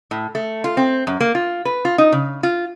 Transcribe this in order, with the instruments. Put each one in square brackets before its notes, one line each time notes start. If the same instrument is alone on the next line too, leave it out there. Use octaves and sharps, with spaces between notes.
[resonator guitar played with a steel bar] A2
A3
F4
C4
F#2
A#3
F4
B4
F4
D#4
C#3
F4